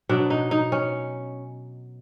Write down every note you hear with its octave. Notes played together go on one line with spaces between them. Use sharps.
B2 F#3 D4
D#4
D#4
C#4